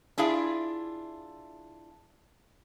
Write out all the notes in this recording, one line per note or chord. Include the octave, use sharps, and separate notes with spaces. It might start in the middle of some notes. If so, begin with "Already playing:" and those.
D4 E4 F4 G#4 E5